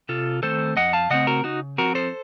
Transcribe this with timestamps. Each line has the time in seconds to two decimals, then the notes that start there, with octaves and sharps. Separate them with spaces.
0.09 C3 F4 A4
0.43 D#3 A3 C4 A4 C5
0.77 F2 D#5 F#5
0.93 F5 A5
1.10 C#3 A3 C4 D#5 F#5
1.27 F#4 A#4
1.44 C#3 D#4 F#4
1.78 F3 C4 F#4 A#4
1.95 A4 C5